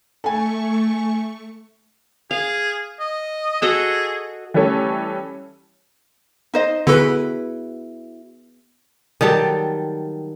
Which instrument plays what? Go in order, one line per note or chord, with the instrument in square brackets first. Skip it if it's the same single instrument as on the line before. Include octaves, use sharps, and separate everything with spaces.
[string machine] A3 C#6 [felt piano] A4 G#5
[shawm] G#4 [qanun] F5
[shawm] D#5
[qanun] F#4 A4 D#5 [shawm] G#4
[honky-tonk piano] E3 G3 A3 C#4 A4 C#5
[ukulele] D#4 C5 D#5
[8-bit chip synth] D3 A4 [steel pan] B3 G#4 B4 [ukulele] E4 F#4
[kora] D#3 F#3 G3 A4